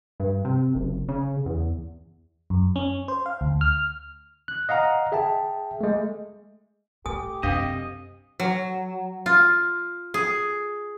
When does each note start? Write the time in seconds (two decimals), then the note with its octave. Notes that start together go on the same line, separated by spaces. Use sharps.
0.20 G2
0.45 C3
0.75 F#1
1.09 C#3
1.46 E2
2.50 F#2
2.76 C#4
3.08 C5
3.26 F5
3.41 D2
3.61 F6
4.48 F#6
4.69 D#5 F5 F#5 A#5
5.12 G#4 E5 G5 A5
5.81 G#3 A3
7.06 A2 G4 A4 G#5 D#6
7.43 F#2 C3 D4 D#5 F5
8.40 F#3
9.26 F4
10.14 G#4